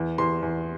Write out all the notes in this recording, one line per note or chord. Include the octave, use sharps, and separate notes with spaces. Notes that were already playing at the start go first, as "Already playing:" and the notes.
Already playing: E2
E2 C6
E2